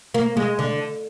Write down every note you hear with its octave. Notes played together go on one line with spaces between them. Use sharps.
A#3
G#3
D3